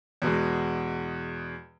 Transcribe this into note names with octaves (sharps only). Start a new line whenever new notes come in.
E2 B2 G#3